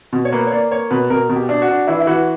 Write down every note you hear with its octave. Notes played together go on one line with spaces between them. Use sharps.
B2
C#5
A#3 B4
C#5
A#3 D5
A#3 C#5
B2 B4
B2 A#4
B2
G4
D4
F#4
D4
E3 E4
E4
E3 F#4